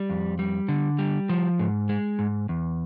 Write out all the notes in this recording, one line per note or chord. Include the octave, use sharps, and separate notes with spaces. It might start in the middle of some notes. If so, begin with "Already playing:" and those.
Already playing: G3
F2
G3
D3
G3
F3
G#2
G#3
G#2
E2